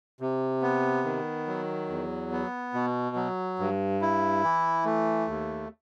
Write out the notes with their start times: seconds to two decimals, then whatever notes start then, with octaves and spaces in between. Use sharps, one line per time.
0.20 C3
0.62 B3
1.04 D#3
1.47 F#3
1.89 E2
2.32 B3
2.74 B2
3.16 F#3
3.59 G2
4.01 E4
4.44 E3
4.85 A3
5.28 D#2